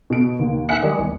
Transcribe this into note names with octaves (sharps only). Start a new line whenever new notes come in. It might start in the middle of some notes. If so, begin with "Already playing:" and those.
B2 D7
D#2
E5 F#5 G#5 F#6 C#7
D#3 G3 G#3
E2